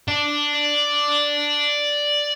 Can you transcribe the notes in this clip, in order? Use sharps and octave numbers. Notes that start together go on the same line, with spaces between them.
D5 A5